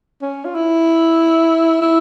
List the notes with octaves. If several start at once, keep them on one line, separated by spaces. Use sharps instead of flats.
C#4
F4
E4
E4